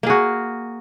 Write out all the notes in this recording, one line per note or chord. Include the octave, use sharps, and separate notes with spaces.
A#3 F#4 G#4